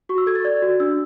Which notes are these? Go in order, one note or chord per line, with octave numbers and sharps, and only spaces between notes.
F#4 C#6
E6
A4 G#6
A6
D5 G#6
F#4
D4 E6